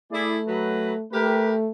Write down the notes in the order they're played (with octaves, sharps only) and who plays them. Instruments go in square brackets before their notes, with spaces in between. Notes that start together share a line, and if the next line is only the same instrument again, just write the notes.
[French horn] A3 [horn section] E4 G#4 D5
[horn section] F#3 B4
[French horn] A3 [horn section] G4 A#4 B4